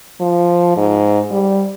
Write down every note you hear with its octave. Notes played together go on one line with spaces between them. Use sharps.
F3
G#2
G3